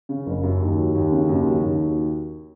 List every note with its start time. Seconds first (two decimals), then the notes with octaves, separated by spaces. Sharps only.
0.09 C#3
0.26 F#1
0.43 F#2
0.61 D#2
0.77 F#3
0.95 D#2
1.12 C#3
1.29 D#2
1.45 F#3
1.63 D#2